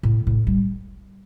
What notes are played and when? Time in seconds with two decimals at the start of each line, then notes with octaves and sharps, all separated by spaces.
0.03 A2
0.27 A2
0.47 G3